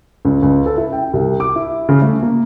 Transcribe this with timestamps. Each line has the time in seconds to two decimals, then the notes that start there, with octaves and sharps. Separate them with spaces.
0.25 C#2
0.42 C#2
0.66 A4
0.77 E4
0.92 G5
1.13 C2
1.40 D6
1.56 E4
1.89 C#3
2.02 A3
2.22 A#3